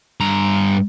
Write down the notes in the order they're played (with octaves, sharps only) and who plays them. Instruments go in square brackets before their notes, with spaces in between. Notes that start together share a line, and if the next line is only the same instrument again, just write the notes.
[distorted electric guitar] G2 A#5